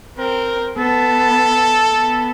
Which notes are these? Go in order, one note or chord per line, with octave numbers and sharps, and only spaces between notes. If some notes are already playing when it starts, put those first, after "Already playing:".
C4 A#4
B3 A4
B3